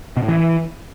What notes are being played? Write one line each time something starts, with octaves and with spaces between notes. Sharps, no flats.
B2
A2
E3